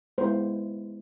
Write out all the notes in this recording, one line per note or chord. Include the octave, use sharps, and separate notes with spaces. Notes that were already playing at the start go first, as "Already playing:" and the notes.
G#3 B3 E4 C5